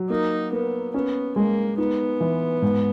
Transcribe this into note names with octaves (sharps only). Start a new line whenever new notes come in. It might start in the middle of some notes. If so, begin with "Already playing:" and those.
Already playing: F#3
A#3 D#4
A#3 B3
B3 C#4
G#3 A#3
B3 D#4
E3
G#2